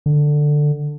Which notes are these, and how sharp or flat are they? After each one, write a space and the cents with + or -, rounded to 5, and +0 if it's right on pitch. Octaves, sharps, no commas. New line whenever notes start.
D3 +10